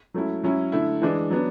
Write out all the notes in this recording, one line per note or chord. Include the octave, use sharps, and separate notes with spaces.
F#3 A3 C#4 E4
F#3 C#4 E4
D3 A3 E4
E3 G#3 D4
F#3 B3 D4